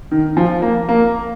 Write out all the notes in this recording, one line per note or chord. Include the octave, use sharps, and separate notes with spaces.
D#3
F3
A#3
A#3